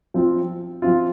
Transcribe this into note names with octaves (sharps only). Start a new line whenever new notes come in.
F3 C4 F4
F3 C4 F4